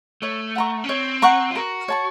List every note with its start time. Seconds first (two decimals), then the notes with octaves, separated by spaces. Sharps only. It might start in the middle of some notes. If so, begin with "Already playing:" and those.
0.22 A3 C#5
0.56 F#5 A#5 C#6
0.84 C#4
0.89 C4 C#5
1.22 F#5 A#5 C#6
1.51 F4
1.55 F#4 A#4
1.88 C#5 A5 C#6